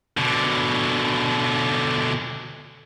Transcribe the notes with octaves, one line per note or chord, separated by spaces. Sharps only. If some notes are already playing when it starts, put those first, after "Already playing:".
B2 D3